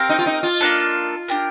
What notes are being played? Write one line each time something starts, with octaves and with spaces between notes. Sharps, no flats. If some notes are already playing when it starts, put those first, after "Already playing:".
Already playing: C4 G4 A#4 F5
D#4
F4
D#4
F4
A#3 D4 A4
D4 G4 A#4